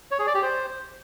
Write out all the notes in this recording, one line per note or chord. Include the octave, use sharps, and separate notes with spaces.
C#5
G#4
D5
G4
C5